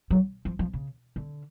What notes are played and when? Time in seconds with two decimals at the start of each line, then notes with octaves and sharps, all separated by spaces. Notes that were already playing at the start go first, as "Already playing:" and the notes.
0.11 F#3
0.45 F3
0.59 F3
0.73 C#3
1.16 D3